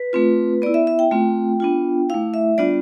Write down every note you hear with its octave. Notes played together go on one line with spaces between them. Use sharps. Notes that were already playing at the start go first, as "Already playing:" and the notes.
Already playing: B4
A3 C4 F4
B3 E4 D5
E5
E5
G5
A3 C4 F4
B3 D4 F4
A3 E4 F5
E5
G3 B3 D4 F4 D5